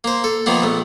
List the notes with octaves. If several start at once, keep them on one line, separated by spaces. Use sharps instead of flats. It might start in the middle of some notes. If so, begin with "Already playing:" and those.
A#3 C5
A4
D#3 F3 A#3 B3
A#1 A3